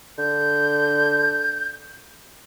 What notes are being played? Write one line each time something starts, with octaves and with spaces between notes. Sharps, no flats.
D3 G6